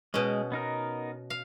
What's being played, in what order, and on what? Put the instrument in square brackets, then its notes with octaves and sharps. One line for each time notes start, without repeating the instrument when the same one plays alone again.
[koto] B2 C#4 [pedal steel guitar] G#3
[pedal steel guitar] B3 D#4 A#4
[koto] F5